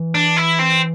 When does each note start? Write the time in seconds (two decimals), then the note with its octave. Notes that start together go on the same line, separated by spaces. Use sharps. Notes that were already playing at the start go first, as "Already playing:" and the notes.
Already playing: E3
0.15 D4
0.37 E4
0.59 C4